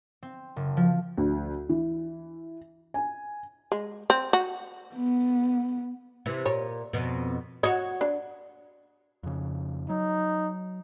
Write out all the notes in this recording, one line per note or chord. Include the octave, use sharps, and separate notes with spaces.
C4
F#1
F3
D2
E3
G#5
G#3
C4
F#4
B3
C3 E3
A#2 C#5
F2 B2
F#4 C#5 D#5
D4
F2 C#3
F#3 D#4